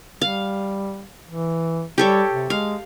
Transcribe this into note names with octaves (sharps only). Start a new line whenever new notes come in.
G3 F5
E3
G3 G4 A4 C#5
C3
G#3 F5